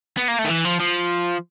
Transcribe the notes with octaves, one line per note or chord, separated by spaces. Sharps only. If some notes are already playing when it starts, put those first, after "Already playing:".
B3
A#3
A3
D#3
E3
F3
F3